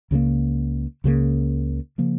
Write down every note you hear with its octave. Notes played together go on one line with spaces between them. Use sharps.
C#2 C#3 F3 A#3
C#2 C#3 F3 A#3
C#3 F3 A#3